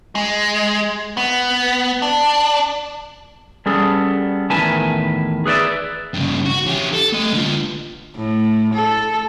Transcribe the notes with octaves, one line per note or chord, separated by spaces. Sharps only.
G#3
B3
D4
G3 B3 C#4 G#4 A4
E2 A2 D#3 B4 G#5 A5
G#4 B4 C#5 D5 E5
G2 C#3
F#4
C#4 G4
A4
A3 D#5
D3 F4
A2
A4